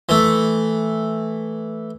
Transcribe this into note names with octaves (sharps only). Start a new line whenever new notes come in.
E3 A3